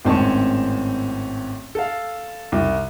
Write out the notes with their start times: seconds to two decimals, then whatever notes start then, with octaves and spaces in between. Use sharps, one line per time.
0.05 G#1 A2 C4 C#4 A5 C#6
1.75 A4 F5
2.52 C2